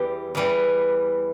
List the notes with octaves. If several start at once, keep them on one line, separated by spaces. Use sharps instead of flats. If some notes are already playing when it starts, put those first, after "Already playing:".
Already playing: E2 E3 G3 G4
E2 E3 G3